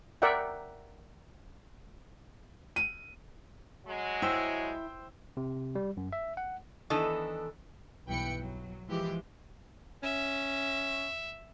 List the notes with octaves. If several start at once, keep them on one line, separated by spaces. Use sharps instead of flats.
A#4 D5 E5 F#5 G5
D#7
F#3 G#3
E4 C5 G5 E6
C3
G3
F#2
E5
F#5
D#3 E3 B3 D4 A4 D#5
B1 G2 E3 B4 G5 C#7
F#3
E3 F3 G#3 G4
C#4 E5